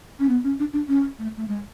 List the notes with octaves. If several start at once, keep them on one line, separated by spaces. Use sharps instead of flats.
C#4
B3
C#4
D4
D4
C#4
A3
A3
G#3